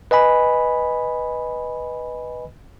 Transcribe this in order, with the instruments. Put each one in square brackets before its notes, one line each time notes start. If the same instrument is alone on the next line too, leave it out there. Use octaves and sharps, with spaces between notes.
[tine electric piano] B4 D#5 G#5 B5